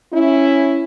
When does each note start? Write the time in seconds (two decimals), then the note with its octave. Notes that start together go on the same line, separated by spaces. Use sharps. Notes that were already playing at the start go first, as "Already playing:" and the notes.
0.13 C#4 E4